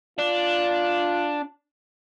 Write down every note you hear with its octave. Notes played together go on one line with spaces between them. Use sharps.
D4 F4